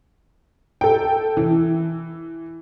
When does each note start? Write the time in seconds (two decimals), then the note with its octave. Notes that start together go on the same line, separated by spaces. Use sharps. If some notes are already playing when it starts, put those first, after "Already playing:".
0.81 A4 G5
1.37 E3